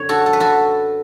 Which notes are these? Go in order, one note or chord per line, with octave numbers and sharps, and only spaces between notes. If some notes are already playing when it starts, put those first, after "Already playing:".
Already playing: F#2 D3 C#5
F#4 A4
A4
B4
F#4 A4